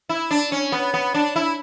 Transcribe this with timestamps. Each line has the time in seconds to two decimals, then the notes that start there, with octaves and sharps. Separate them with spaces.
0.09 E4
0.31 D4
0.52 C#4
0.72 B3
0.94 B3
1.15 D4
1.36 E4